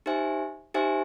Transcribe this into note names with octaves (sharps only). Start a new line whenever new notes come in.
D#4 G4 C5 E5 G#5
D#4 G4 C5 E5 G#5